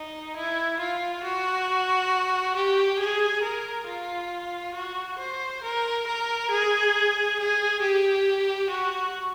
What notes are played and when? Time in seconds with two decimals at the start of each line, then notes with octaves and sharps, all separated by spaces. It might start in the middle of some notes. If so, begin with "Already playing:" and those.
Already playing: D#4
0.36 E4
0.79 F4
1.24 F#4
2.55 G4
2.99 G#4
3.43 A#4
3.87 F4
4.75 F#4
5.19 C5
5.63 A#4
6.07 A#4
6.50 G#4
7.38 G#4
7.82 G4
8.69 F#4